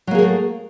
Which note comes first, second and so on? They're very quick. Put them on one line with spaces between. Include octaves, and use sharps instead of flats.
F#3 A#3 G#4 A#4 A3